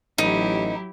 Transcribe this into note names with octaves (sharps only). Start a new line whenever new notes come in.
A1 F#3 D#4 E4 G4